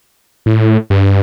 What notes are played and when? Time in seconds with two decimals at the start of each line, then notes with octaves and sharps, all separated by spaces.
0.46 A2
0.90 G2